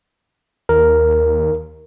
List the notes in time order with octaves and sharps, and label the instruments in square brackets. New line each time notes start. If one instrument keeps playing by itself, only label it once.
[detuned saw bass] D#2 [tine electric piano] A#4